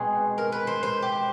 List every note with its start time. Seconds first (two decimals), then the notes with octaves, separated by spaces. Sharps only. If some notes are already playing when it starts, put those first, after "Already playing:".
Already playing: B2 G#3 C4 G#4
0.38 A#4
0.52 B4
0.67 C5
0.83 C5
1.02 G4